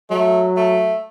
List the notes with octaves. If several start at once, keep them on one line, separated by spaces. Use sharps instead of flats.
F#3 A3
A3